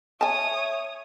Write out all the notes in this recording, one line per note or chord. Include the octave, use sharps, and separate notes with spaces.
C#5 E5 G#5 A5 D#6